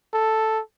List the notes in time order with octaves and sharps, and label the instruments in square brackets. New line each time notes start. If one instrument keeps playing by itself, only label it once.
[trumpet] A4